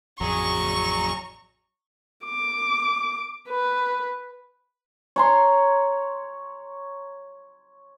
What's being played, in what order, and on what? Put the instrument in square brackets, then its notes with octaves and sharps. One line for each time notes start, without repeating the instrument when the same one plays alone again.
[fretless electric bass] A1 F2 [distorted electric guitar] F#3 G#4 [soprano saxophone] A#5 [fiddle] C#6
[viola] D6
B4
[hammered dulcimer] C#5 A#5 C6